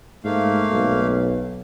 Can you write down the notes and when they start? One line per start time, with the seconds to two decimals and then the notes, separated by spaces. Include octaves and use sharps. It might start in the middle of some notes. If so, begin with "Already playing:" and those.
0.24 G#2 A3 A#3 F5
0.70 B1